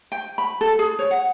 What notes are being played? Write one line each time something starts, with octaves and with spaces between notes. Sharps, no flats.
G5
B5
A4
G#4
C#5
F#5